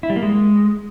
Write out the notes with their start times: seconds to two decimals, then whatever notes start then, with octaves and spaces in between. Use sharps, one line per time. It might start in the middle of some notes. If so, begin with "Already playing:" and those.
0.03 E4
0.10 G3
0.16 A#3
0.23 G#3